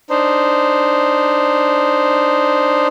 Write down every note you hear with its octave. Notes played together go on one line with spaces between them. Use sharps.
D4 D#4 C5